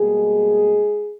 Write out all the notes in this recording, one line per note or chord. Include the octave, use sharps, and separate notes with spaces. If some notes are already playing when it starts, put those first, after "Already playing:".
Already playing: B2 G3 G#3 A#3 G#4